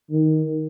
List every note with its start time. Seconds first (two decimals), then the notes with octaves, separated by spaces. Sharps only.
0.11 D#3